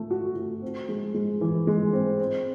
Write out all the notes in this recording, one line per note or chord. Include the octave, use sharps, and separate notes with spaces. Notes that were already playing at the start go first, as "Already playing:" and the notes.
Already playing: A3
F#4
F#4
C4
G#3
G#3
E3
G#3
C4
C4